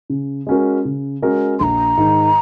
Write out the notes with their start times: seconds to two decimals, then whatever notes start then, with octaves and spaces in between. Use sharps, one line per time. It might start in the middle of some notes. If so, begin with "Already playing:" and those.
0.10 C#3
0.47 G#3 C#4 F#4 A#4
0.85 C#3
1.22 G#3 C#4 F#4 A#4
1.59 A#1 A#5 C6
1.97 G#2 D#3